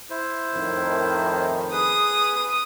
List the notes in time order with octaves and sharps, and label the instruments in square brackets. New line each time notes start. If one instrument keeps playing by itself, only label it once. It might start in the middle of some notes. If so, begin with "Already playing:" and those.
[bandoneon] E4 C5
[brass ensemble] F2 A2 D#3
[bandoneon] G#4 B4 [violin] D#6